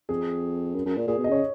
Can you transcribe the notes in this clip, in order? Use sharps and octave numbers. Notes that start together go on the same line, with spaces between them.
F2 G#4
F#2
F#2
A#2
A#2 G#4
B2
D#5
C#3 C#5